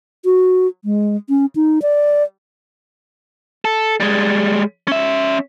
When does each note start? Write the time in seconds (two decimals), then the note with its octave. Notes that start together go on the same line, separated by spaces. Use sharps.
0.25 F#4
0.85 G#3
1.29 C#4
1.56 D#4
1.82 D5
3.65 A4
4.00 G3 G#3
4.88 C#4 E5